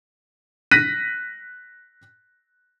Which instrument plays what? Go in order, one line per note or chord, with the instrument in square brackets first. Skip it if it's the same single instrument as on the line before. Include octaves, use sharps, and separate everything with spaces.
[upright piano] F#6 A#6 B6 D#7